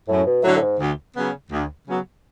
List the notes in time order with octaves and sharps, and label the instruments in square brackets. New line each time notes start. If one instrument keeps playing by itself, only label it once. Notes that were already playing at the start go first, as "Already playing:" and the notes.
[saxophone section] F#2 [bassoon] A2
[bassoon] B2
[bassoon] A2 [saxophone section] D3 F#3
[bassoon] A2
G#2
[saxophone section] D2
C#3 F#3 B3
D2
C#3 F#3 B3